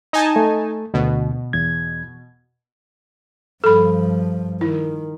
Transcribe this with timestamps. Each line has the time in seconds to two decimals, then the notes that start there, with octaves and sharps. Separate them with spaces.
0.13 D#4 G#5 A5
0.36 A3
0.94 D2 B2
1.53 E2 G#6
3.64 G2 F3 A4 B5
4.61 D#3 E4